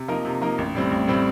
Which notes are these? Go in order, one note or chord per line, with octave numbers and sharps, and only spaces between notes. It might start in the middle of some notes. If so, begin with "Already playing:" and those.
Already playing: C3
F3 A#3 D#4 A#4
C3
F3 A#3 D#4 A#4
A1
A2 G3 C4
A1
A2 G3 C4